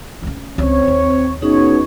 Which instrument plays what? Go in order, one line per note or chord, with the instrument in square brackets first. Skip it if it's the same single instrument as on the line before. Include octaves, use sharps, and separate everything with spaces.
[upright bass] D2 C#3
[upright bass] C#2 C#3 [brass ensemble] C4 C#5
[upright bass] D#2
[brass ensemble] B2 C#5 [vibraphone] C#4 D#4 G#4